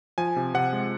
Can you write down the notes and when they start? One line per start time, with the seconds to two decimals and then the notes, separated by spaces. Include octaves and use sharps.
0.18 F3 G#5
0.36 C3
0.54 C3 F#5
0.73 G#3